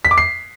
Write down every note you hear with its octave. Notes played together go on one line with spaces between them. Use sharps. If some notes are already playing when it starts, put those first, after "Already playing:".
B6
D6
C7